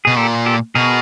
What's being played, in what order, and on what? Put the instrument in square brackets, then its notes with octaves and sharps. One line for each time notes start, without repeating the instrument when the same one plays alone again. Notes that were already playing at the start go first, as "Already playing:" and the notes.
[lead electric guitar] B2 [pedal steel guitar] G#4
[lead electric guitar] A#2 [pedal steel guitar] G4 A4
[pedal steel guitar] G4 A4
[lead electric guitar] B2 [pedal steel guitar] G#4 A#4